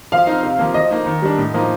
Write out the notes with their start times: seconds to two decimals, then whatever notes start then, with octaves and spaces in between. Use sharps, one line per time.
0.12 F3 F5
0.27 C4 D#4
0.43 C3
0.59 F3 A#3
0.74 F3 D#5
0.91 A#3 D#4
1.06 D#3
1.22 G3 D4
1.38 A2
1.54 F3 A#3 D#4